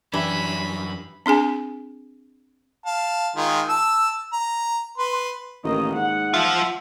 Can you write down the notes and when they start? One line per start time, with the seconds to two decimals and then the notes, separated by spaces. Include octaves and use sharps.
0.13 F#2 E3 D4 G4 E5 B5
1.26 C4 D4 G#4 G#5
2.86 F5 A5
3.36 D#3 G#3 F4
3.69 A5 E6
4.33 A#5
4.98 B4 C6
5.64 A1 D#3 A#3 D#5
5.95 G#2 F#5
6.34 F3 F4 E5